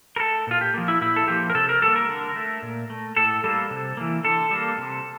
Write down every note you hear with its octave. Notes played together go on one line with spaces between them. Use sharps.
A#4
A3 A4
A#2 F4
G4
F3 A#3
E4
A#2 E4
A4
F3 A#3 G4
A#4
C3 A4
A#4
G3 A#3 A4
A#4
D3
A3
A#2
A3
A2 A4
G3 A#3 A4
C3
E3 A#3
D3 A4
G3 A#3
C3